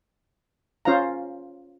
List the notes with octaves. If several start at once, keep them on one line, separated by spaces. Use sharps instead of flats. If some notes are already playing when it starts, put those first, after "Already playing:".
C#4 F4 C5 F5 A#5